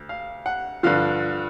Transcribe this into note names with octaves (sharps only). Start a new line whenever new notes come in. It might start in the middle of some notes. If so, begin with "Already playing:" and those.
Already playing: D2
F5
F#5
G2 D3 F3 F5